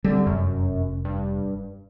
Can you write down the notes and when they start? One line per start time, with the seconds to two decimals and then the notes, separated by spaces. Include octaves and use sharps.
0.04 D3 G3 G#3 C4
0.27 F1 F#2
1.05 G2